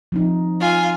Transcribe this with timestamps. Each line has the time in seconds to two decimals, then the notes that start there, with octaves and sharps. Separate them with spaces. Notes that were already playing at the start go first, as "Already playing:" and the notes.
0.12 F3 C4 D#4
0.60 F4 G#5